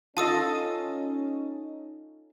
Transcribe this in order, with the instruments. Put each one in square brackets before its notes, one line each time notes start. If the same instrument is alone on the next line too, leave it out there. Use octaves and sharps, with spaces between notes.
[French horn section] C#4 D#4 [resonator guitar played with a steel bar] F4 A4 D#5 [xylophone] A5 D#6 E6